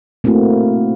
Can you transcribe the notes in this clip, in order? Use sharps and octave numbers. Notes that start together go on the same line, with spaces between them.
A3 A#3 C4 E4 F#4